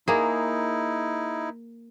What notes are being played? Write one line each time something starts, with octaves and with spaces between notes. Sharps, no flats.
A#3 D#4 E4 G#4